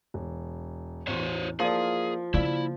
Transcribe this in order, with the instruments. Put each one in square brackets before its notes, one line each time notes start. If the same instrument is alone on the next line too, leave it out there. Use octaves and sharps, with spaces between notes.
[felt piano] E1
[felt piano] A1 E2 C6 [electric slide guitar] F#4 C5 C#5
[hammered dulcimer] F3 [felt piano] A#3 D5 [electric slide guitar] G#4
[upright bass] C#3 A#3 [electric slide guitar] E4 [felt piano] D5 F5